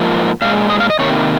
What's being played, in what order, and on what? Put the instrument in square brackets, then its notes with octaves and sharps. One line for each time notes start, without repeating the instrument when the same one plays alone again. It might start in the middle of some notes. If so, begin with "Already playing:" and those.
Already playing: [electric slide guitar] G#2 F3 A#3
A#2 G#3 F5
D#5
F5
D#5
C3 D#3 A#3 C#5